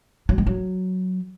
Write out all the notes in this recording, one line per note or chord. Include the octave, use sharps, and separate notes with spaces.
F#3
G#3
F#3